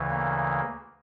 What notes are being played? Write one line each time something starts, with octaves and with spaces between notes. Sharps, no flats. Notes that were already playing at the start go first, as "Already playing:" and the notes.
Already playing: D2 C#3 E3
A#3